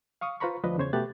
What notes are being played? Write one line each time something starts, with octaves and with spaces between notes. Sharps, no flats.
F5 C#6 D#6
F4 B4 C5 A#5 B5 C#6
D2 F3 B4 D5 D#5
E2 C#3 C5 C#5 G#6
B2 A3 B3 G4 F#6 A6